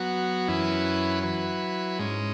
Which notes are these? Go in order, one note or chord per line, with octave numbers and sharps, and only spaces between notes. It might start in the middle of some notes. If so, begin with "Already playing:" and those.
Already playing: F#3 B3 F#4
F#2 E3 C#4 E4 B4
F#3 E4 B4
G#2 G#3 C#4